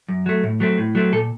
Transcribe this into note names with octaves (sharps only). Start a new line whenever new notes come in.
F#2
F#3 A3
A2
F#3 A3 C4
A2
F#3 A3 C4
A#2 A4